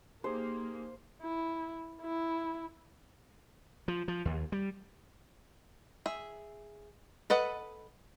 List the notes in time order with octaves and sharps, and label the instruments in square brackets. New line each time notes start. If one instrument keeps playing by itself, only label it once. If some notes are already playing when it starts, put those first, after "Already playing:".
[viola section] A#3 [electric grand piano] D#4 G4 G#4 [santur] C5
[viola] E4
E4
[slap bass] F3
F3
D#2
G3
[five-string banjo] G#4 E5
A4 B4 D#5 F#5